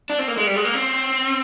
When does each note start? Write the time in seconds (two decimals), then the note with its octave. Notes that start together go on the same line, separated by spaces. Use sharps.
0.10 D4
0.19 C4
0.28 A#3
0.37 G#3
0.47 G3
0.56 G#3
0.65 A#3
0.74 C4